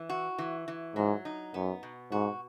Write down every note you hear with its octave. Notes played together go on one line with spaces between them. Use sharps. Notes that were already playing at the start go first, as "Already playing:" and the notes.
Already playing: E3
F#4
E3
E3
G#2 F#3
D#4
F#2 B3
B2
G#2 F#4